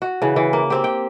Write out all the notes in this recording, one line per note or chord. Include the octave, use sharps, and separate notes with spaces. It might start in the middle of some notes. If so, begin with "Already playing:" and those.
F#4
C#3 E3
E3
A#3
C4 G4
G5